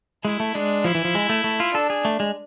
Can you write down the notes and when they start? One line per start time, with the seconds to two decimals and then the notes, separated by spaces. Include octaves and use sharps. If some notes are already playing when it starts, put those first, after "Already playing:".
0.24 G#3 E4
0.40 A3
0.55 G#3 D4
0.84 F3 E4
0.95 E3
1.05 F3
1.15 G#3
1.30 A3
1.44 A3
1.60 F4
1.75 D4 A4
1.90 G#4
2.05 A3
2.20 G#3